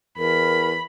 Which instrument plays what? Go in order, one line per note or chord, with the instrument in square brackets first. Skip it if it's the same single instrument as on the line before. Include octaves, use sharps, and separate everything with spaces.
[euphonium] E2 [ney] A#4 [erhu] B5